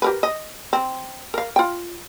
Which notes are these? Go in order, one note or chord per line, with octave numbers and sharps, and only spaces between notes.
G4 A#4 B4
D#5
C4
A#4 F5
F4 G5